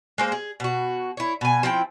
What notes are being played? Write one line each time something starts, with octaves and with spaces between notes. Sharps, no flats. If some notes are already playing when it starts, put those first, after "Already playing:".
G#3 A#3 C5
G#4
B2 F#4
E4 C#5
B2 G#5
F3 C4 E4 G5